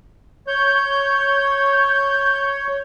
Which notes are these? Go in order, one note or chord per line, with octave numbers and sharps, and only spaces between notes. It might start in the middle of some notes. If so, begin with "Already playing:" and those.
C#5 G6